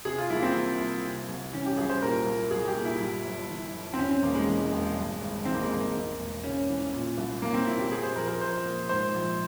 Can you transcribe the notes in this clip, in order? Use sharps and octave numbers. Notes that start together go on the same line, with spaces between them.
C3 G#4
F4
C2 E4
A#3
C4
E3
C2
C3
C2
E3 C#4
G4
C2 G#4
C5
A#2 A#4
C2
C2 G#4
G4
A#2
E4
G2
G1
E3
G1
C4
E2 C#4
C4
E1 A#3
G#3
E3
E1
G2
G#1
E3 C4
A#3
G#3
G#1 A#3
E2
E1
C#3 C#4
E3
A#2
C2
C2 A#3
C4
A#2 E4
G4
A#2 G#4
C5
A#1 A#4
A#4
A#1 C5
A#2
G#2 C5
A#1